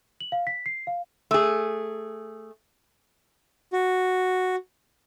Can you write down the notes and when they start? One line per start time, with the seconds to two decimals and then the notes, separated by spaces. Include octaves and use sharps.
0.21 F#7
0.32 F5
0.47 B6
0.66 C7
0.87 F5
1.31 A3 G#4
3.73 F#4